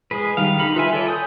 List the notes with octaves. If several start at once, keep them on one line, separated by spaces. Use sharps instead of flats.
G#3 G#4 B4
D#3 G3 F5
D3 D#4 B5
F4 B4 E5 G#5
A4 C#5 D5
G#5 D#6 G6